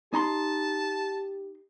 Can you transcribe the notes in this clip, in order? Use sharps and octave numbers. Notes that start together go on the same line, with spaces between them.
D#4 G4 A5 A#5 C6